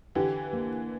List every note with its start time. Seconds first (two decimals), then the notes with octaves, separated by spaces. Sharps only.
0.15 D3 E3 G4
0.53 A#3